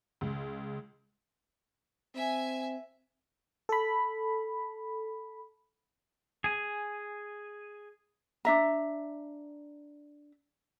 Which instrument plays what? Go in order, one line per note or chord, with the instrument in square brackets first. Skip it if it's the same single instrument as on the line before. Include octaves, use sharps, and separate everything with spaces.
[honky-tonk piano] C#2
[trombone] C4 [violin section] E5 G#5
[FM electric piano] A4 B5
[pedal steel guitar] G#4 G#5
[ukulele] D4 E5 A#5